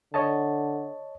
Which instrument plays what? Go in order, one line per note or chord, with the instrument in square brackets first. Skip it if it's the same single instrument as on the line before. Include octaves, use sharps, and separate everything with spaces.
[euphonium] D3 [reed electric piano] C#5 D#5 A5